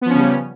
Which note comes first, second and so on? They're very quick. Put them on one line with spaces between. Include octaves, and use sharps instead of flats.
B3 F3 C#4 C#3 G3